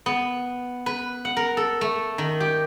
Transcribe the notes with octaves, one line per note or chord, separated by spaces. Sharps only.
B3
B4
F#5
A#4
A4
A3
D#3
G4